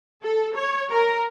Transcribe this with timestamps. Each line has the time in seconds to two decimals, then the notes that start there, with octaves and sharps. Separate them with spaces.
0.22 A4
0.55 C#5
0.91 A#4